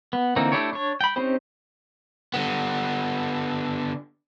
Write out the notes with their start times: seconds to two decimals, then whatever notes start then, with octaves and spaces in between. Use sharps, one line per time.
0.13 B3
0.36 D3 E3 A#3 C4 D#4
0.52 A3 D4 E4 G4 C#5
0.73 D4 C#5
1.01 G5 B5
1.16 C4 C#4 D#4 G4 C5
2.34 D3 B3